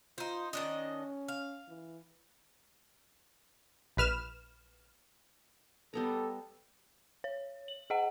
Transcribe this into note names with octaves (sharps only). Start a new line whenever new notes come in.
D#4 F4 C5
D#3 C#4 D4 D#5
F5
E3
A#1 B4 F6 E7
G3 B3 A4 A#5
C#5
F#7
G#4 D#5 F#5